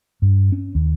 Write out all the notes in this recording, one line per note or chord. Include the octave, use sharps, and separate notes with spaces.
G2
C#4
D#2